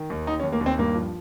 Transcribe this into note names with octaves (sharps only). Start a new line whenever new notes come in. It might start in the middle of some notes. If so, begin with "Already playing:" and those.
Already playing: D#3
D#2
D#2 D#4
C#4
D#2
A#3
D#2
C4
G2 A#3
F3